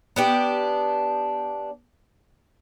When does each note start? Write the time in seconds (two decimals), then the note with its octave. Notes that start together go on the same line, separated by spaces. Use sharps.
0.16 B3 D4 G4